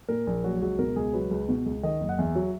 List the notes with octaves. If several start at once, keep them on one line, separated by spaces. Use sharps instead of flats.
A#2 A#4
A#1
F#3 F#4
C#2 F#4
B2 A#4
C#2 G#4
F#3 B4
C#2
B2
C#2
D#3 D#5
F#1
F#5
E2 E5
F#3